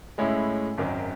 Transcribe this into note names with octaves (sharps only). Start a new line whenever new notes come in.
A2 G#3 C#4 E4
G#1 F#2 D#3